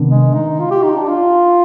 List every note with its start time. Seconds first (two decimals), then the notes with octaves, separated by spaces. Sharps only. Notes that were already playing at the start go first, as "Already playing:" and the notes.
Already playing: C3 D#3 B3 D4
0.10 G#3
0.34 D#4
0.59 F4
0.71 G4
0.83 D#4
0.96 D4
1.08 F4